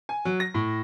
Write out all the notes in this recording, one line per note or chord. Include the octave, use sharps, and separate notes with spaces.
G#5
F#3
A#6
A2